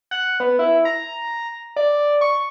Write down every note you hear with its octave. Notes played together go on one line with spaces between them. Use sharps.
F#5
B3
E4
A#5
D5
C#6